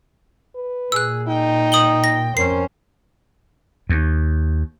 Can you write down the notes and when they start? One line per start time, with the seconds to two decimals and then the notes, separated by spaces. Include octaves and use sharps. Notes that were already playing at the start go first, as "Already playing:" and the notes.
0.55 B4
0.92 A#2 G#4 E6 F#6
1.28 D#4 G5
1.72 D#6 F#7 G7
2.04 A#6
2.37 F2 C#4 A#4 C5 C7
3.89 D#2